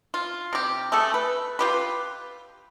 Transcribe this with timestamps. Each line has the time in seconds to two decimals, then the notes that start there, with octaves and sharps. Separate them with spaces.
0.14 F4
0.53 C3 G4
0.92 A3 G#4 A4
1.14 B4
1.59 F4 G4 B4